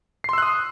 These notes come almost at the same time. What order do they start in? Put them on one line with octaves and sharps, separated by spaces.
C7 C6 E6 F#6 D#6